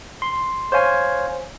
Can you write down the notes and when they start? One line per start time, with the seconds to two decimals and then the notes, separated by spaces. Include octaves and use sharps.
0.22 C6
0.72 C5 C#5 F5 G#5